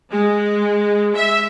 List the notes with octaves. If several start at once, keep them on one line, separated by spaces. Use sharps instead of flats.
G#3
E5